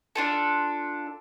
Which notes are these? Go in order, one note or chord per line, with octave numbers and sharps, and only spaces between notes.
D4 F4 A4